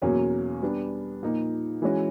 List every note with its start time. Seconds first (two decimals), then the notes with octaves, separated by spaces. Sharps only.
0.02 E2 B2 F#3 A#3 C#4
0.62 G3 B3 D4
1.23 A#2 F3 A#3 D#4
1.82 E3 G#3 C#4 F#4